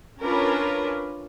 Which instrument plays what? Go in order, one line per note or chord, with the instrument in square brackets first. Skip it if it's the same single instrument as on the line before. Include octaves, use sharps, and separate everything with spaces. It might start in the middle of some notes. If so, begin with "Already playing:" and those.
[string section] C#4 D4 F4 A#4 B4